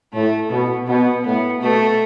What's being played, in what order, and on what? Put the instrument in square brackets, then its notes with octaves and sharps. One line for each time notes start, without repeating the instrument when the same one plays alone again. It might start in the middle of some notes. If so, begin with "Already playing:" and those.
[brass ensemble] A2 [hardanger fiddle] A3
[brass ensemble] B2 [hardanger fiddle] B3
[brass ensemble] B2 [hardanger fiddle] B3
[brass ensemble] A2 [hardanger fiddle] B3
[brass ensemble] B2 [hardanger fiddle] A3